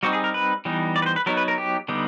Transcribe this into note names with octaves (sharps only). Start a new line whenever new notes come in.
G3 C4 D#4 F#4
G#4
A#4
B4
E3 G3 B3 D#4
D5
B4
C5
B4
F#3 B3 D#4 A#4
B4
A#4
G4
D3 G3 B3 D#4